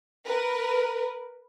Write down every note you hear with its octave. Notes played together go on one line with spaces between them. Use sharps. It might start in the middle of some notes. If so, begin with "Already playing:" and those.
A#4 B4